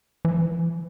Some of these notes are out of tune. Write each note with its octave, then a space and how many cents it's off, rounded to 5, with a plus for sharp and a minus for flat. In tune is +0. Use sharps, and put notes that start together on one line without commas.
E3 +40